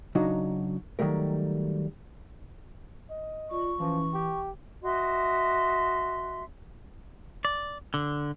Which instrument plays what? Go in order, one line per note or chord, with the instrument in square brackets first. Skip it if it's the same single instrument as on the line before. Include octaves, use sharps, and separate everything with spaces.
[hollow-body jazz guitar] C#3 F#3 D4 D#4 F#4
D#3 F#3 G3 A3 A#4
[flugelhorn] D#5
[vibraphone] F4 D5 [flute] C#6
[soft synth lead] E3 [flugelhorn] F3 [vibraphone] C#4
[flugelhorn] G4 [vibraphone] G5
[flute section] F#4 D#5 E5 C6
[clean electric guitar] D5
D3